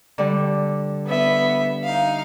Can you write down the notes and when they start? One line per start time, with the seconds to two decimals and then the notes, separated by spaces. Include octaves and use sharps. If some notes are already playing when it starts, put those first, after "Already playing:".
0.18 D3 G3
1.06 B3 E5
1.84 D#4 F5